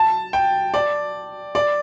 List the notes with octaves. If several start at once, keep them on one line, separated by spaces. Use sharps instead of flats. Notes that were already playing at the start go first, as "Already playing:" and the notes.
Already playing: A5
G5
D5
D5